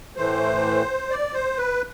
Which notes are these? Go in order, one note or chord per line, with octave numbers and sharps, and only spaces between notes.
A2 E3 A3 C5
D5
C5
B4